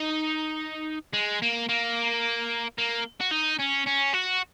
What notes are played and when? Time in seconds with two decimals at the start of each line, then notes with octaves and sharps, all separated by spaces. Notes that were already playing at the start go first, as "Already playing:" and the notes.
Already playing: D#4
1.14 G#3
1.42 A#3
1.69 A#3
2.78 A#3
3.21 F#4
3.31 D#4
3.60 C#4
3.87 C#4
4.14 F#4